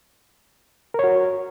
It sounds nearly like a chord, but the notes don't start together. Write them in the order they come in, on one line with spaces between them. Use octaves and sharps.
A#4 C#5 F#4